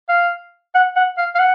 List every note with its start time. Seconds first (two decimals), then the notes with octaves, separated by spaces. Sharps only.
0.09 F5
0.75 F#5
0.96 F#5
1.18 F5
1.35 F5
1.39 F#5